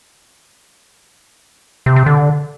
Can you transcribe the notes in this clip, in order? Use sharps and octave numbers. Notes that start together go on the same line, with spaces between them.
C3
C3
D3